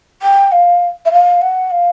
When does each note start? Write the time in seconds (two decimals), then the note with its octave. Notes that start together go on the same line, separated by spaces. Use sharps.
0.22 G5
0.52 F5
1.05 E5
1.12 F5
1.42 F#5
1.71 F5